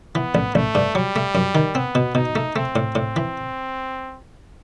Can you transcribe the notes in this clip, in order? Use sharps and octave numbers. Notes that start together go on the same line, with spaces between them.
E3 B3
A1
A1 A3
G2
F#3 G3
A3
F#2
D#3
B3 C4
B2
B2 D#4
A3
A3 C4
A2
A2
E3